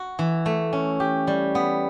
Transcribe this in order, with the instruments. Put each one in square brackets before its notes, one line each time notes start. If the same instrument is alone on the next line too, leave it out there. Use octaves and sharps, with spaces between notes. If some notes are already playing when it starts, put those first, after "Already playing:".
Already playing: [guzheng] F#4
E3
A3
C#4
G4
G3
B3